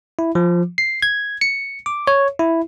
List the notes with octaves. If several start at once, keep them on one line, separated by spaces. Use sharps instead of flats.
E4
F3
C7
G#6
C#7
D6
C#5
E4